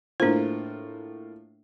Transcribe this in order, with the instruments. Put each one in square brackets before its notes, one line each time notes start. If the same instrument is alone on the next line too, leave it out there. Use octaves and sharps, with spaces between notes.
[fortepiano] A2 A#3 F4 [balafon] D4 C5